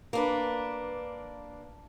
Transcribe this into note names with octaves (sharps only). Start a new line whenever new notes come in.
A#3 D4 B4